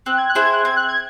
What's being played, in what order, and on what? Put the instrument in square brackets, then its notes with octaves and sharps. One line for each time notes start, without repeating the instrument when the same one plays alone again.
[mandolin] C4 [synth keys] F#6
[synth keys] G#6
F#6
[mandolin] E4 G#4 C5
[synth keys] G#6
F#6
[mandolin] C4 [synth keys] G#6
[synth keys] F#6
G#6